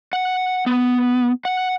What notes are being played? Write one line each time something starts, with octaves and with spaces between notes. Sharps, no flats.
F#5
B3
F#5